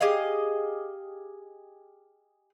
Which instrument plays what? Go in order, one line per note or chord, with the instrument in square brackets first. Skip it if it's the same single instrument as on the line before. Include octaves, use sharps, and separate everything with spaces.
[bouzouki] G4 G#4 D#5 F5